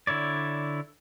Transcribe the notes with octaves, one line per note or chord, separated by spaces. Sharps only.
D3 E4 C#5 D5